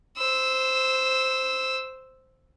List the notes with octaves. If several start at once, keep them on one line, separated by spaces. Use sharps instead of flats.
C5 E6